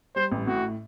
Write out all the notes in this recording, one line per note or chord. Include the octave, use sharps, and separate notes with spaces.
G3 C5
A1
A2 F#4